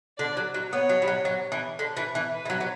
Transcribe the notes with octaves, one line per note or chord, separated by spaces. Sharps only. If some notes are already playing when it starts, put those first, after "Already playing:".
D3 D5
F#3
F#3
B3 C#5
F#3
G3
F#3
F#3
E3
D3
E3
E3
B4
E3
F#3
F#3